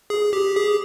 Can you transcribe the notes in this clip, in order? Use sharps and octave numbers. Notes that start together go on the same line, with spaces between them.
G#4
G4
G#4